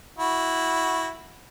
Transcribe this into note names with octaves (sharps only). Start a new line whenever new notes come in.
E4 F#4